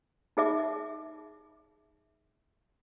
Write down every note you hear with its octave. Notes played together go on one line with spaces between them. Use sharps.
D#4 G#4 E5 D6